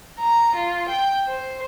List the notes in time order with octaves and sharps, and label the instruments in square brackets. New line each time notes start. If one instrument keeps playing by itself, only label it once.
[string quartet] A#5
F4
G5
C5